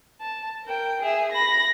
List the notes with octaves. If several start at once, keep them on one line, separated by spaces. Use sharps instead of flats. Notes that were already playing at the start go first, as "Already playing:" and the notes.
A5
A#4 G5
G#4 E5
B5 A#6